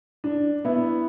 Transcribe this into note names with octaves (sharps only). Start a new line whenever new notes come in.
D4
B3 E4